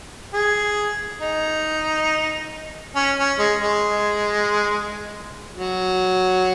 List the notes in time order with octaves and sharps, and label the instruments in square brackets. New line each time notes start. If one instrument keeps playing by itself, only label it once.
[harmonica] G#4
D#4
C#4
C#4
G#3
G#3
F#3